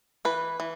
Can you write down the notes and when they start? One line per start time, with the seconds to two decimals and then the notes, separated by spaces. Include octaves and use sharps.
0.25 E3 B4
0.60 E3